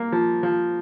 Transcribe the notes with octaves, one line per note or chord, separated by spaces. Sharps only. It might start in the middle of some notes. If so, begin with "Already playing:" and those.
Already playing: A#3
F3
F3